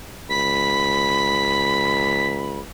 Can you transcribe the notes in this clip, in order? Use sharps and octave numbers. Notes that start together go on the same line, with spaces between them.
C#2 B5 B6